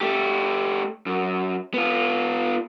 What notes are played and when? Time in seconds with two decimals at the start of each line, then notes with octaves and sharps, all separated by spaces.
0.01 A3 G4
1.06 F#2
1.74 B3 F4